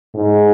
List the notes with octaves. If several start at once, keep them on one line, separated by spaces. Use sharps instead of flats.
G#2